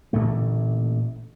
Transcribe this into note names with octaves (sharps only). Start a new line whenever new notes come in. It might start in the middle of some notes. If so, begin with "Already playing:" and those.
A1 A#2 D3 A3